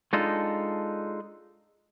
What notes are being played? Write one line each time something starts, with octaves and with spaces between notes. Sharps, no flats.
G#3 D4 D#4 F4 A4